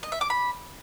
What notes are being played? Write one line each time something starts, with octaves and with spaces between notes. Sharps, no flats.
D#5
E5
D6
B5